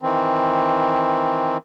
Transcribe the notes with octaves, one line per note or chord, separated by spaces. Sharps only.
D#3 E3 C4